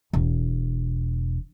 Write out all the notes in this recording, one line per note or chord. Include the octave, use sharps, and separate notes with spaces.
E1